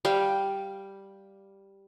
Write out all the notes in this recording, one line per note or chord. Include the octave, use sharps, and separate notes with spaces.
G3 F5 G5